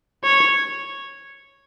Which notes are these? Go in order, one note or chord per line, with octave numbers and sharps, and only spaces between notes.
C#5